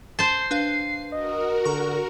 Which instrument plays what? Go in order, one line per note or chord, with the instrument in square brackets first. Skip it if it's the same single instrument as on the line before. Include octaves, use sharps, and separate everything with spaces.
[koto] C5 A5 [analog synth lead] C7
[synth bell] D4 B4 F5
[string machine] F#4 A#4 [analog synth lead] D#5
[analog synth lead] D3 [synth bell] A#5 C#6